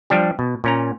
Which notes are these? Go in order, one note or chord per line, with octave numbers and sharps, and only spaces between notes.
F3 G3 D4 G4
B2
A#2 C#4 A#5